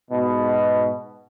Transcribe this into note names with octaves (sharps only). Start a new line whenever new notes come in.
G#2 B2